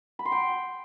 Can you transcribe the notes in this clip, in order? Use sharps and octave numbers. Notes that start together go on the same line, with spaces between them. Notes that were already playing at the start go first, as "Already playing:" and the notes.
B5
C6
G5